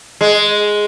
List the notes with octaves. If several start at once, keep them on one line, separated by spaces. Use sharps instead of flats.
G#3